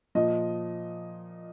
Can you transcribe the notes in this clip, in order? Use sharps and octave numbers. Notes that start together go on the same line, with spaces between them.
A#2 F3 D#5